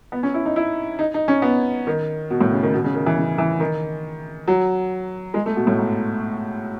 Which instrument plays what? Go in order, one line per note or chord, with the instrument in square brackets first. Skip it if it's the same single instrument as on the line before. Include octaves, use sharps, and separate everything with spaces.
[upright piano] B3
C#4
E4
D#4
E4
D#4
D#4
C#4
B3
D#3
B2
A2
C#3
D#3
B2
C#3
D#3
E3
C#3
E3
D#3
F#3
G#3
A3
B2
A2
G#2